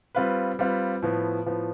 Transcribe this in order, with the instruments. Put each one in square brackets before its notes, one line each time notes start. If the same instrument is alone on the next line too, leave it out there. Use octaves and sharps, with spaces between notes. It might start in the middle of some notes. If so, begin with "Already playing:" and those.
[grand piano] G3 C4 F4 B4
G3 C4 F4 B4
A2 F3 B3
A2 F3 B3